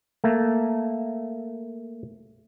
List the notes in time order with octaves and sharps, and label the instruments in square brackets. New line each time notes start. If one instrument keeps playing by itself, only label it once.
[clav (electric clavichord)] A3 A#3